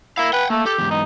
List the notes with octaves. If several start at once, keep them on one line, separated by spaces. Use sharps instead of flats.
E4 A#4 F5
B4 F#5 G5
A3 A#3
G4 A4
E2 G#2
D#4